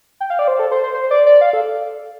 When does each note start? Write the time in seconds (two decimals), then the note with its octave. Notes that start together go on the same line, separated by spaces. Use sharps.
0.20 G5
0.30 F5
0.39 D5
0.48 C5
0.59 A4
0.72 C5
0.83 C5
0.94 C5
1.11 D5
1.26 D5
1.41 F5
1.53 A4